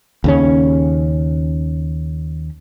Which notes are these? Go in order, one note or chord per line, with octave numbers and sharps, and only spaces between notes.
D#2 C#3 C#4